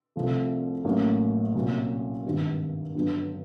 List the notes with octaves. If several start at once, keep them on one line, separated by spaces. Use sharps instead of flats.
C2 C3 F3 A3
A1 A2 F#3 A#3
C2 A#2 F#3
G#1 G2 D#3 G3 B3
G2 D3 F#3 B3